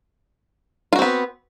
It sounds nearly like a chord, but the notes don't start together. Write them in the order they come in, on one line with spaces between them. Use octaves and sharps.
F4 F#4 C4 B3